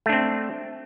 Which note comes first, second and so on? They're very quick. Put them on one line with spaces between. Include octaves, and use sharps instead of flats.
A3 D4 C4